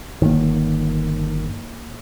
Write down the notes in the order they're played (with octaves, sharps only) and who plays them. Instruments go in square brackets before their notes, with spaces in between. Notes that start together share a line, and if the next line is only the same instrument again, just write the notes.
[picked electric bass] G1 D#3 [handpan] A#3 C#5